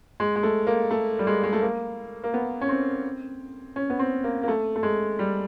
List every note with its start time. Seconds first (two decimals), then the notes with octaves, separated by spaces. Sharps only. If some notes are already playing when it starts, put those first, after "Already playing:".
0.20 G#3
0.36 G#3
0.43 A3
0.67 A#3
0.91 A3
1.19 G3
1.27 G#3
1.43 G#3
1.53 A3
1.62 A#3
2.24 A#3
2.34 B3
2.61 C#4
2.69 C4
3.76 C#4
3.90 B3
3.99 C4
4.24 A#3
4.43 A#3
4.48 A3
4.76 A3
4.83 G#3
5.19 G3